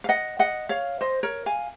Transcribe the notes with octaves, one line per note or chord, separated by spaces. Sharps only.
F5
D#5 F#5
D#5 F#5
C#5 F5
C5 D#5
A#4 C#5
F5 G#5